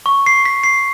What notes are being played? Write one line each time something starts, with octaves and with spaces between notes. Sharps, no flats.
C#6
C7
B6
C7